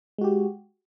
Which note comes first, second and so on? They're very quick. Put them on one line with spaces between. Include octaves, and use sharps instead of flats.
G#3 F#4 G4